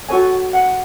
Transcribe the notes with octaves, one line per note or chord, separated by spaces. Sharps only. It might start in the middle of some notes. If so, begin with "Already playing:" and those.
F#4 A4 C#5 G#5
F#5